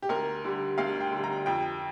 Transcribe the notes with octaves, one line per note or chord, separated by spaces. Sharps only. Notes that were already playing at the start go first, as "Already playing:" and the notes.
G4
D2 A#4
D3 G3
D2 F5
G5
D3 G3
A#5
F2 G5